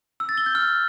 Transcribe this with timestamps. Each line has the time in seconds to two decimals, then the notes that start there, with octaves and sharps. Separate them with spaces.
0.20 E6
0.29 A6
0.38 G7
0.46 G6
0.55 F6